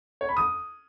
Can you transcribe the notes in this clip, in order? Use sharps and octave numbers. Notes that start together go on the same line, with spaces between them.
C#5
B5
D#6